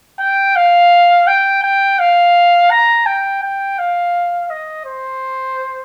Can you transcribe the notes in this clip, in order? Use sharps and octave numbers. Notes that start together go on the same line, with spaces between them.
G5
F5
G5
G5
F5
A#5
G5
G5
F5
D#5
C5